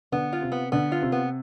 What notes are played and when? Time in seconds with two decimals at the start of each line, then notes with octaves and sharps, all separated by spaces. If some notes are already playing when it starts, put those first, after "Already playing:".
0.12 D3 B3
0.33 F4
0.42 C3
0.52 B3
0.72 D3 B3
0.92 F4
1.02 C3
1.12 B3